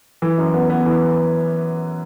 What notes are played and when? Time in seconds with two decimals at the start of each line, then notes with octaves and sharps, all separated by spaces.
0.22 E3
0.38 F#2
0.54 B3
0.70 B3
0.86 E3